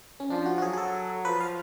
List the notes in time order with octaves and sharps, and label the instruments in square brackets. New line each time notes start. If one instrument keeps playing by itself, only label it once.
[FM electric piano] C#4
[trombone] F3 [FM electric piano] D4
[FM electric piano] F#4
F#4
[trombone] F#3 [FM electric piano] G#4
[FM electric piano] G#4
A4
[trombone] F3 [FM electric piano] B4
[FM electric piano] F5